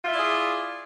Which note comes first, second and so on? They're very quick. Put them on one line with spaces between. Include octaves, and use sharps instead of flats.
F4 E5 E4 D5 G#4